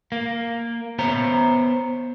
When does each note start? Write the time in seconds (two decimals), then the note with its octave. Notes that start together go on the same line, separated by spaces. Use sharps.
0.12 A#3
0.99 B3 C5 C#5 A#5